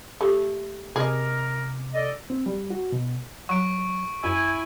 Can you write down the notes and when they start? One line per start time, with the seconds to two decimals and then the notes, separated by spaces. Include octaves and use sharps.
0.21 A3 G4
0.96 C3 G#4 A#4 D#5 D6
1.94 A4 D5 D#5
2.30 C4
2.46 G3
2.70 F#4
2.92 B2
3.49 F#3 C#6 D7
4.24 F#2 E4 G#5